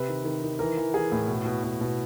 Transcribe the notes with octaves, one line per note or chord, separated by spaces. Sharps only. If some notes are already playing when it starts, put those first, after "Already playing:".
Already playing: C3 B4
D#3
D#3
D#3
E3 A#4
E3
E3 G#4
A2
B2
B2
B2
B2